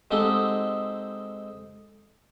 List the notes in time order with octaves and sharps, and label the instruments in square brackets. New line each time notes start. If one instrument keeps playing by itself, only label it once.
[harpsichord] G#3 C4 D#4 G4 A4 F#5